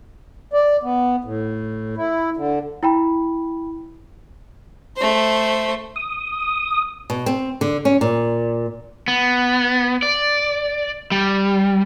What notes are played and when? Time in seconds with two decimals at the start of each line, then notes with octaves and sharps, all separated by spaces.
0.53 D5
0.83 B3
1.24 A2
1.97 E4
2.37 D3
2.83 E4 G5 B5
4.97 A3 C5
5.96 D#6
7.10 B2
7.26 C4
7.61 D3
7.85 C#4
8.01 A#2
9.08 B3
10.03 D5
11.12 G3